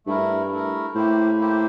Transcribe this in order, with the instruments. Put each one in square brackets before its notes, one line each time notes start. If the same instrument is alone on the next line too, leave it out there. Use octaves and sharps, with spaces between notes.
[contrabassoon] G2 [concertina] A3 E4 A#4
[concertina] A3 E4 A#4
[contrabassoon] A2 [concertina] A#3 E4 G4 C5
[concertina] A#3 E4 G4 C5